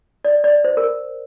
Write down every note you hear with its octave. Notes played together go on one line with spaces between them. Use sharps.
D5
D5
C5
A#4